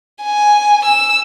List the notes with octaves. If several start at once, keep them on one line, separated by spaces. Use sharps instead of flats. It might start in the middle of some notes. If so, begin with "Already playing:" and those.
G#5
E6